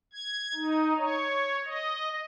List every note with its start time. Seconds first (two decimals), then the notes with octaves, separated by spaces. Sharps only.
0.13 G#6
0.54 D#4
0.98 C#5
1.65 D#5